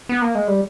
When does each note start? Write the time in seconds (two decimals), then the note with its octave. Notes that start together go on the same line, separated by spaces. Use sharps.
0.09 B3
0.22 A#3
0.35 G#3
0.48 G3